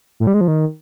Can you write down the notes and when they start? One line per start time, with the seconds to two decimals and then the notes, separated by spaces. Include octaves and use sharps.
0.20 A2
0.27 G3
0.34 G#3
0.41 F3
0.48 D#3